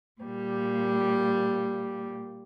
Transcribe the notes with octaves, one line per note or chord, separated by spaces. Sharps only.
A#2 G3